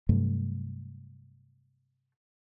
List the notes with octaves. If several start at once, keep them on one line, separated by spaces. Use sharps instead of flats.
G2 C3 F#3 A3